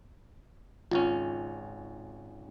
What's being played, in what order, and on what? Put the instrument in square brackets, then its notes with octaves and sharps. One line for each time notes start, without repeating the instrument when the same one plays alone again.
[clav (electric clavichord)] G#1 C#2 C#4 [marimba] F4